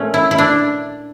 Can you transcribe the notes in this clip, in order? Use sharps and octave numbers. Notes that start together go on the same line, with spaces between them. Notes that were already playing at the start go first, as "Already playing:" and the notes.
Already playing: A#2 F3 A3 C#4
E4
E4
D4